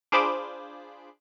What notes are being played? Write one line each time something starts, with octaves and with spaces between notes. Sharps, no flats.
D4 F4 G#4 C5 B5 D6